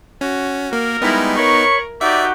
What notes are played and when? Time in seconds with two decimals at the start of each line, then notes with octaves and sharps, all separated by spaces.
0.21 C#4 F#4
0.73 A#3 A#4
1.02 G3 G#3 B3 D#4 E4 B5
1.37 A#4 C#5 B5 C#6
2.01 D#4 F#4 G4 D5 E5 F#5